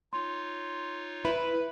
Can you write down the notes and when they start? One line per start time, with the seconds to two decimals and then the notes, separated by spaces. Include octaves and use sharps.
0.13 D#4 F4 C#5 C6
1.25 E4 B4